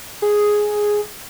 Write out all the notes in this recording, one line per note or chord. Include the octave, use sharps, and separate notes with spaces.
G#4